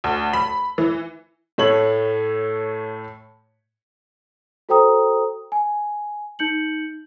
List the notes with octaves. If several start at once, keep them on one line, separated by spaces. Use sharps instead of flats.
D2
B5
E3
A2 A3 C#5 F#7
F#4 A4 C5 G5 A#5 D#6
G#5
D#4 G6 C#7 F#7